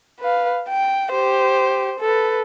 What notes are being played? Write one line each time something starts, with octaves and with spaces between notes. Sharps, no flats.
B4 F5
G5
G4 C5
A4 B4